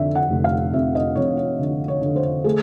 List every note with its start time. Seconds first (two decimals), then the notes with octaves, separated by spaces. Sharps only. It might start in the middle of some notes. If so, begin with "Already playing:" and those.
Already playing: F2 D3 D5 E5
0.15 F#5
0.30 F1
0.44 F5
0.73 F2 E5
0.95 D#5
1.16 F2 C#5
1.37 C#5
1.59 D3
1.88 C#5
2.02 D3
2.16 C5
2.44 A3 G#4